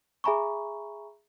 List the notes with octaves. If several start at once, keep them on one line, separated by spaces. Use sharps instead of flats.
G#4 E5 G#5 A#5 B5 C#6